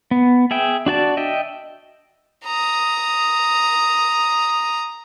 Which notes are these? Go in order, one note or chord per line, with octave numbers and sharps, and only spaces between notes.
B3
G#4 E5 G5
D4 F#4 D5 A5
D#5 E5 G5
A#5 D#6